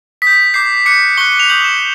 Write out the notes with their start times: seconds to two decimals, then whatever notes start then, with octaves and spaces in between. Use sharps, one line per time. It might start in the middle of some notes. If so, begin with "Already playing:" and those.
0.22 D#6 G6 B6
0.54 D6 G6 C7
0.86 D6 F#6 C#7
1.17 C#6 F#6 G7
1.40 F7
1.50 D#6 G6 F#7
1.64 E7